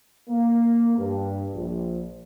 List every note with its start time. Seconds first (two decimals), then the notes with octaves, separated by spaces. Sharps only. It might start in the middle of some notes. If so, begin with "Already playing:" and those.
0.29 A#3
0.98 G2
1.53 A#1